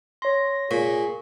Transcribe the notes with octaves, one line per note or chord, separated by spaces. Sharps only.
C#5 C6 A#6
A#2 G#4 C#6 B6